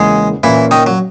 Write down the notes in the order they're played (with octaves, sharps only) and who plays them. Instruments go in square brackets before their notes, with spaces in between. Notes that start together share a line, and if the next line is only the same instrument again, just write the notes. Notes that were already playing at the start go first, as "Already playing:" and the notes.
Already playing: [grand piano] E2 C#3 E3 A#3 [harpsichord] G#3 G#4
[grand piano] A#2 A#3 C#4 [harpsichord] E3 E4
[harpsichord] D#3 D#4
F#3